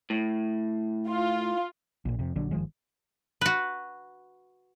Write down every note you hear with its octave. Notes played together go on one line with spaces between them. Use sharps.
A2
F4
A#1 A#2
F2 C3
A#1 D3 F#3 D4
G1 D#3 F3 G#3
F#4 B4